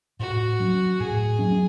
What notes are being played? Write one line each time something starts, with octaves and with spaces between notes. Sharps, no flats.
A2 F#4
F#3 C#4
A2 G#4
F#3 C#4